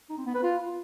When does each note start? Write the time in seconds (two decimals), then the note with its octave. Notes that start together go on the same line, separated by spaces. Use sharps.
0.10 D#4
0.18 C4
0.26 B3
0.35 B4
0.43 F4